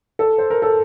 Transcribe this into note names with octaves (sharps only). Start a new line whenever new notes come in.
A4
C5
A#4
A4